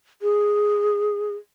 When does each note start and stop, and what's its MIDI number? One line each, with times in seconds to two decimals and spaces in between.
0.22 1.34 68